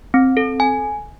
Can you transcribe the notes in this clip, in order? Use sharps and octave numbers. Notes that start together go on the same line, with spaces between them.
C4
A4
G#5